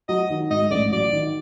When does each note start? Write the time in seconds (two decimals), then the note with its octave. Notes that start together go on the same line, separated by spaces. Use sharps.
0.09 F#3 D#5
0.30 D#3
0.50 G#2 D#5
0.71 A1 D5
0.92 F#3 D5
1.13 D#3